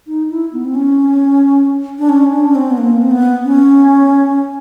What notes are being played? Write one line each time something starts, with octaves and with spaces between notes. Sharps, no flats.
D#4
E4
B3
C4
C#4
D4
C#4
D4
C#4
C4
B3
A#3
C4
B3
C#4